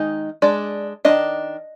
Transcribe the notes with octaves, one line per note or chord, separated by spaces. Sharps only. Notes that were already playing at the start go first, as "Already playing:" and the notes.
Already playing: D#3 G#3 D#4
G#3 D4 D5
D#3 A#3 D4 D#5